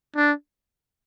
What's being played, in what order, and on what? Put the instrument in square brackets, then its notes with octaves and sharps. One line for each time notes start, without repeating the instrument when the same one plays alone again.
[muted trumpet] D4